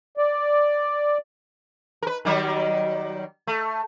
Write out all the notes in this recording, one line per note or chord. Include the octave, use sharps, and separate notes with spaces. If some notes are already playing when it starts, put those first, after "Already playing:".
D5
A#4 B4
D#3 F#3 G3
A3